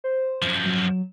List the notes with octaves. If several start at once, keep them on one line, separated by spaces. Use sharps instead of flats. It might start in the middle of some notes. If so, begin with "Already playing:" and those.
C5
F#2 F3
F#3